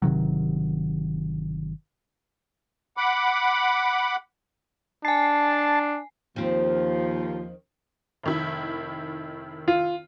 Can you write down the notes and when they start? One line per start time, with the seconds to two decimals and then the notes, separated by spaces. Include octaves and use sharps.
0.02 G1 C3 D#3 F#3
2.97 F#5 B5 D6
5.05 D4 G#5 A5 C7
6.36 D#2 D#3 F3 C4
8.23 F1 D#3 E4
9.68 F4